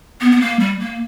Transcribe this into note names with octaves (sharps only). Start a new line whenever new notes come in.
B3
B3
A#3
G3
A#3